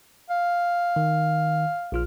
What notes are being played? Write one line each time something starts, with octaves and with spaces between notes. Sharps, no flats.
F5
D#3
A#1 F4 F6